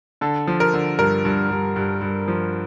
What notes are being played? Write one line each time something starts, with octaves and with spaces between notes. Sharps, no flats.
D3 A4
F3
A#4
D3
G2 A#4
G2
G2
G2
G2
F3